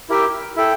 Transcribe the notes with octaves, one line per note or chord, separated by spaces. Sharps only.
E4 G4 A#4 E5 G5
E4 A4 E5 G5